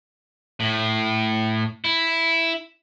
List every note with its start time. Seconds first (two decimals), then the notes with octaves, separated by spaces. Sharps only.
0.60 A2
1.85 E4